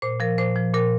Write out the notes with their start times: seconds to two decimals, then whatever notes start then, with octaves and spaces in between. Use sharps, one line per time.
0.02 A#2 C5
0.20 F3 A#4
0.38 A#2 C5
0.56 F3
0.74 A#2 A#4